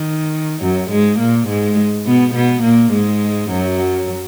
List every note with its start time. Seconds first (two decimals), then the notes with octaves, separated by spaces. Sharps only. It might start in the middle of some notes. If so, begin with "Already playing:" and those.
Already playing: D#3
0.61 F#2 F#3
0.91 G#2 G#3
1.19 A#2 A#3
1.49 G#2 G#3
2.06 B2 B3
2.35 B2 B3
2.63 A#2 A#3
2.93 G#2 G#3
3.50 F#2 F#3